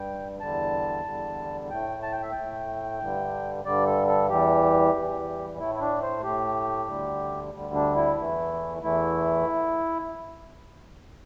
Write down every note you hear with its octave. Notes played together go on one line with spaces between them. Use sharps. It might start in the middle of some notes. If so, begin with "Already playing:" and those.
Already playing: G2 G3 G5
E2 D3 G3 A5
E2 D3 G3
A2 A3 G5
A5
G5
E5
A2 A3 G5
G2 D3 G3
G2 D3 G3 D5
A4
A4
E2 E3 G3 G4
E2 E3 G3
A2 A3 E4
E4
D4
C5
A2 A3 G4
D2 D3 G3
D2 D3 G3
D4
E4
E2 E3 A3
E2 E3 A3 E4